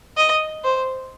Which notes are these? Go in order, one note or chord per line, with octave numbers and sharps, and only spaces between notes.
D#5
C5